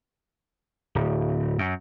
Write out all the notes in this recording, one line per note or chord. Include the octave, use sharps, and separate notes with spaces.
D1
F#2